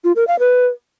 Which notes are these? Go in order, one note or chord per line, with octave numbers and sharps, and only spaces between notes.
F4
A#4
F5
B4